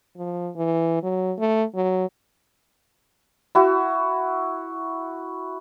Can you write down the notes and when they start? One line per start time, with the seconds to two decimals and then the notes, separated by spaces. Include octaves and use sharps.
0.17 F3
0.56 E3
1.03 F#3
1.39 A3
1.75 F#3
3.55 E4 F#4